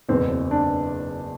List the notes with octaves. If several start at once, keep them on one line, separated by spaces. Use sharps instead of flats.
F#1 E2 B2 C4
C4
D4